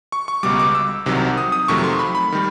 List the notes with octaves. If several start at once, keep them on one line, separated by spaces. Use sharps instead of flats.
C#6
C#6
C#2 B2 G3 D6
D6
E6
C2 C3 D#3 F#3
D#6
D#6
F2 C3 D#3 F#3 A3 C#6
C6
B5
B5
D#3 G3